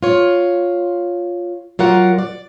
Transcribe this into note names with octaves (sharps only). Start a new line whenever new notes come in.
F4 C#5
F#3 F4 A#4 F#5
D5